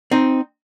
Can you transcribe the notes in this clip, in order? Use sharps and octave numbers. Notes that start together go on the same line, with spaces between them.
C4 D#4